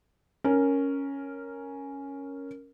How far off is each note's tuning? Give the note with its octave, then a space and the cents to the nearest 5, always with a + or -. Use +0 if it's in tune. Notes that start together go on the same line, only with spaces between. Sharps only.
C#4 +0 A#4 +0